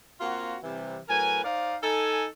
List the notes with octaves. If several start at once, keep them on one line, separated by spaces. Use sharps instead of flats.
A#3 C4 F4 F#4
C3 E3 G3
A2 F#3 A#4 B4 G#5
D#4 C5 D5 F5
D#4 A4 G#5